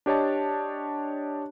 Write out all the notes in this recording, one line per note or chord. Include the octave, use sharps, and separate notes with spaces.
D4 G4 C#5 D#5 A5